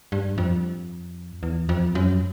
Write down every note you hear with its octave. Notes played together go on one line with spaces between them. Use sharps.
G2
F2
E2
F2
F#2